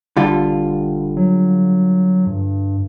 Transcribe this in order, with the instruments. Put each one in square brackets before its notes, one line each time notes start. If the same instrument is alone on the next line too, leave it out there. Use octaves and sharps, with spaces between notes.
[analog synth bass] E1 [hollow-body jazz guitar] D3 G3 F4
[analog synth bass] F#3
G2